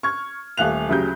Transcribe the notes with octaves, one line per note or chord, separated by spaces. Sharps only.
C#6 F6 G#6
D#1 A3 F5 F#6 F7
D2 C#3 F#3 G4 G6